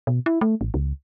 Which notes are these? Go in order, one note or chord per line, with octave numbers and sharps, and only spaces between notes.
B2
E4
A3
A1
C#2